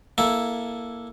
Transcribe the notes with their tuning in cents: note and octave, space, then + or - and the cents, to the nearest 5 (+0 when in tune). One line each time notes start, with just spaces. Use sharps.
A#3 +10 E4 +0 A4 +0